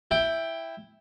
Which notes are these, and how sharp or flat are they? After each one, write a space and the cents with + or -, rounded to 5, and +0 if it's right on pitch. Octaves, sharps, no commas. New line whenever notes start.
E4 +0 G5 +10